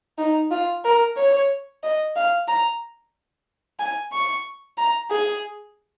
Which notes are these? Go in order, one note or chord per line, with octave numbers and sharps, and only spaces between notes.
D#4
F4
A#4
C#5
D#5
F5
A#5
G#5
C#6
A#5
G#4